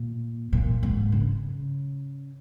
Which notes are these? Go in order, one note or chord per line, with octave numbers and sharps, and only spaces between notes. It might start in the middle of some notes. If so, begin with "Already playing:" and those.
Already playing: A#2
A#2
G#2
C#3